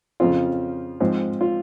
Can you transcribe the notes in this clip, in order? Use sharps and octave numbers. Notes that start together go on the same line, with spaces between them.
F2 C#3 F3 C4 F4
G#2 F3 C4
F4